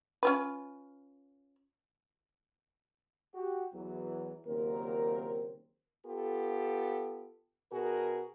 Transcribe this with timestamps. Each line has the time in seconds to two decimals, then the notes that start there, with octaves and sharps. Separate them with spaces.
0.23 C#4 F4 B4
3.35 F#4 G4
3.74 E2 E3 F#3
4.47 D#2 A#2 C#3 F#3 C4 A#4
6.06 B3 F4 G4 A4
7.72 B2 F#4 G#4 A#4